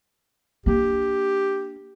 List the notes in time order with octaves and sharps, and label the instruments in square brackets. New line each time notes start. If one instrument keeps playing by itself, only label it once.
[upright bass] A#3 D4 [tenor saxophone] G4